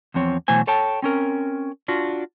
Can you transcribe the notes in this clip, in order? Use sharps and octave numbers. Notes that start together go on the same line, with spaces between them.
E2 F3 C4 C#5
B2 E3 F#3 A3 C5 G#5
A4 C#5 G5 A5
C4 C#4 A#4
D4 F4 F#4